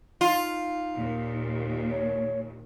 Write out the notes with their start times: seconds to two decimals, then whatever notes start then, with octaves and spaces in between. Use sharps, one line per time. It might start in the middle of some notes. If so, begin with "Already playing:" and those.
0.21 D#4 F4
0.95 D#2 A#2
1.90 C#5